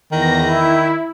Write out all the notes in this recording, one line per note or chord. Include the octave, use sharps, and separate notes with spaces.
E2 D#3 A#6
E4